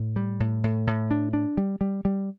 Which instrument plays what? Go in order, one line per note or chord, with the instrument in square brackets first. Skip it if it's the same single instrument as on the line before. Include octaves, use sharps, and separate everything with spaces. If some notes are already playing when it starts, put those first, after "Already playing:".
Already playing: [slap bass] A2
G3
A2
A2
A2
D4
D4
G3
G3
G3